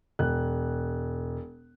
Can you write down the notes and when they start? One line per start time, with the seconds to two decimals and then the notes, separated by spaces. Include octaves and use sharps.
0.19 E1 F#6